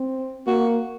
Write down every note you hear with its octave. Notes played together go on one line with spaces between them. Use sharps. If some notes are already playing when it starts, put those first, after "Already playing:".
Already playing: C4
A#3 F#4